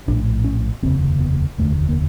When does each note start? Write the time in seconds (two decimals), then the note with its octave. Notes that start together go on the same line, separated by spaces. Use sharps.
0.08 A#1 A2 D4
0.45 C#4
0.83 F1 D#2 C#3 C4
1.20 B3
1.58 F1 D#2 D3 A3
1.89 A#3